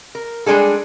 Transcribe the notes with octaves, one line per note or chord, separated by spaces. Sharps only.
A#4
G3 G#3 D4 G#4 A4